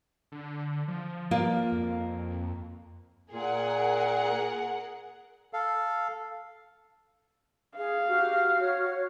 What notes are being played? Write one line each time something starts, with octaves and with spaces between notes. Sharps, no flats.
D3
F3
A#3 F4 D5
F2
A#2 G#4 A#4 F#5
A4 F5
G#4 F5
F#4 G4 F6
C#5